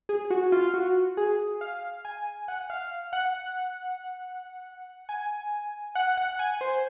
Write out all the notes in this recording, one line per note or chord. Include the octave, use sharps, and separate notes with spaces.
G#4
F#4
F4
F#4
G#4
F5
G#5
F#5
F5
F#5
G#5
F#5
F#5
G#5
C5